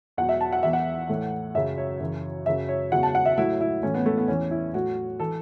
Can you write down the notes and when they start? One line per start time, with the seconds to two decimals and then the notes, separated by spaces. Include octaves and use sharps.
0.17 E2 B2 F#3 F#5
0.29 E5
0.41 A5
0.52 F#5
0.63 E2 E3 E5
0.73 F#5
1.09 A2 E3
1.55 F#2 C#3 F#3 E5
1.78 C#5
2.00 F#2 C#3 E3
2.46 F#2 C#3 F#3 E5
2.69 C#5
2.92 E2 C#3 F#3 F#5
3.03 A5
3.15 F#5
3.26 E5
3.37 A2 F#3 E4
3.61 E4
3.83 A2 E3 C#4
3.94 B3
4.06 A3
4.18 B3
4.28 E2 E3 C#4
4.51 E4
4.74 A2 F#3 F#4
5.20 E3 A4